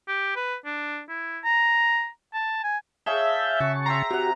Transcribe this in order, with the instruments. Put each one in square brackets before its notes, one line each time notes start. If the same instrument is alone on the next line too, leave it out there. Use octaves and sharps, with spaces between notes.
[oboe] G4
B4
D4
E4
A#5
A5
G#5
[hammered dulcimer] G#4 C#5 [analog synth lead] E5 [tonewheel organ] F5 A5 G6
[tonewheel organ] C#3 A5 C#6 [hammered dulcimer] F#4
[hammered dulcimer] E5 G5 C6 [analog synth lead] A#5
[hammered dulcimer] C3 F#5 [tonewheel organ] F#4 G4